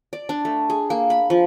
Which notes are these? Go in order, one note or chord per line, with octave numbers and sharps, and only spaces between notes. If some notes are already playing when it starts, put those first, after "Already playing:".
D5
D4
A3
G#4
A#3
B5
F3